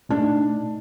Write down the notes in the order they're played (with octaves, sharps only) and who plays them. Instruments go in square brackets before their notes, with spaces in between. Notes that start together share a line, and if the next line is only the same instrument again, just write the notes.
[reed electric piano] A#2 A3 D#4 [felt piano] D4